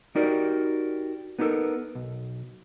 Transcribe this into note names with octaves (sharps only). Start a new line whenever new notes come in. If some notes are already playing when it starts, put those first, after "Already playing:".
D#4 F#4 G4 A#4 D5
B3 D#4 F4 G4 A4 A#4
B1